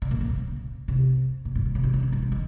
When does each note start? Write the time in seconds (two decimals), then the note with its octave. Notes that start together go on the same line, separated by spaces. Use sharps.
0.02 C#3
0.11 A#2
0.21 F3
0.29 C#3
0.88 C3
1.45 A#2
1.55 G#2
1.65 A#2
1.75 C#3
1.83 C3
1.93 C#3
2.03 C3
2.12 G2
2.22 C3
2.32 D#3